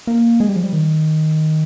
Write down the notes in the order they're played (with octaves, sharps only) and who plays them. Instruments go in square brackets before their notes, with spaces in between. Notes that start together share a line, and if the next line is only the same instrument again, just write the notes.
[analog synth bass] A#3
G#3
G3
F3
G3
D#3